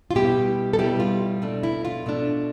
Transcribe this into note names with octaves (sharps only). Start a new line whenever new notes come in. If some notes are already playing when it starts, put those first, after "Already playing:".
F4
B2 G3 B3 E4 G4
A4
B2 G3 B3 E4 G4
F4
B2 A3 D4
E4
F4
B2 A3 D4